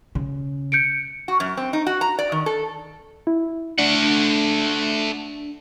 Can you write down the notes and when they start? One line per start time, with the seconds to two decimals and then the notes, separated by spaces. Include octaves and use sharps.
0.15 C#3
0.72 G6 C#7 D7
1.28 F#4
1.40 F#2
1.57 C4
1.73 D#4
1.86 F#4
2.01 A#5
2.19 D5
2.32 D#3
2.46 A4
3.27 E4
3.78 A3 D4 F#5